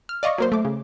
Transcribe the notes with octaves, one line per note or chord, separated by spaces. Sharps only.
F6
D5 D#5 F5 C#6
F#3 A#3 C5
A3 D6
C#3